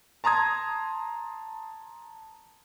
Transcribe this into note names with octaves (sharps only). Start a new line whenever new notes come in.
A5 A#5 C6 D#6 G#6